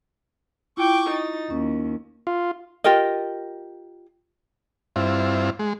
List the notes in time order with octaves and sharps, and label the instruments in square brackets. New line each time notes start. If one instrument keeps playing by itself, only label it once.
[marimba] E4 F4 [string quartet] G5 C#6 D6
[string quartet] D#4 A6
[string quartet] D#2 [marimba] C#4
[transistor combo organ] F4
[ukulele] F4 G4 A#4 D#5
[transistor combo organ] G2 C4 E4 F4
G#3